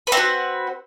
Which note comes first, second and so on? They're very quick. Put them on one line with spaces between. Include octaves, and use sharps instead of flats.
B4 C4 F#4